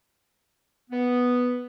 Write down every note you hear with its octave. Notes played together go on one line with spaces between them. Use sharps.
B3